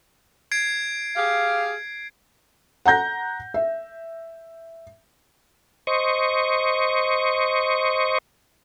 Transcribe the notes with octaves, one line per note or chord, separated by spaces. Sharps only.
G#6 C7 D7
G4 G#4 F5
F#5 A#5 G6 A#6
E5
C5 D#5 C#6